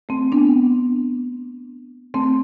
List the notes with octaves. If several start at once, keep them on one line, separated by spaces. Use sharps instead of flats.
A3 C4
B3 D4
A3 C4